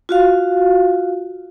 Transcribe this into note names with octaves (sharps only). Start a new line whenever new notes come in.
F4 F#4 F5